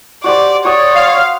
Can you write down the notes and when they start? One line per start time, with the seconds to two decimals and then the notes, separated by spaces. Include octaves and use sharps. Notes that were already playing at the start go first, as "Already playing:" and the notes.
0.24 F#4 G4 C5 D5
0.65 F#4 C#5 D5 D#6
0.95 F5